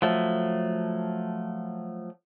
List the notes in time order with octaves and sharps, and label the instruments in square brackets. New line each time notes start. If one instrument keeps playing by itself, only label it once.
[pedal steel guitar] F3 F#3 A3